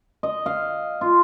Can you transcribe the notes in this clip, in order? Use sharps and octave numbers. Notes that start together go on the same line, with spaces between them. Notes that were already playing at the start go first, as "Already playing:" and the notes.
D#5
F5
F4